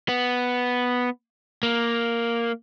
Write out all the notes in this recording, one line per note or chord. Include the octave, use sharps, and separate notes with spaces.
B3
A#3